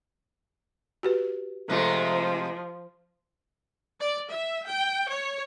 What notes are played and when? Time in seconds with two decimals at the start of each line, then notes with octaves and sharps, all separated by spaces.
1.03 F#4 G4 B4
1.70 C3 F3 G#3 A3
4.00 D5
4.30 E5
4.67 G5
5.10 C#5